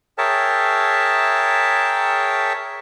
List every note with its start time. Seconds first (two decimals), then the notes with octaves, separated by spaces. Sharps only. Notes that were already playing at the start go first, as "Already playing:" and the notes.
0.18 G#4 A#4 C#5 E5 G5 A5